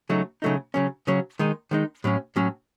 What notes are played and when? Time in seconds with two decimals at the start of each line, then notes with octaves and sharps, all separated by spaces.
0.09 C#3 F#3 A3 D#4
0.42 C#3 F#3 A3 D#4
0.74 C#3 F#3 C#4
1.07 C#3 F#3 C#4
1.39 D#3 G#3 D#4
1.71 D#3 G#3 D#4
2.04 A2 F#3 C#4
2.36 A2 F#3 C#4